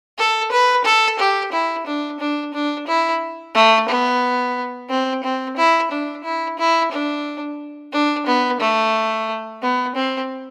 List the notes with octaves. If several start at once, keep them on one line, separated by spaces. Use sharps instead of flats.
A4
B4
A4
G4
E4
D4
D4
D4
E4
A3
B3
C4
C4
E4
D4
E4
E4
D4
D4
B3
A3
B3
C4